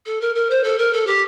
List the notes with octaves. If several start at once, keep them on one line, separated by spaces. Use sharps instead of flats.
A4
A#4
A#4
C5
A4
A#4
A4
G4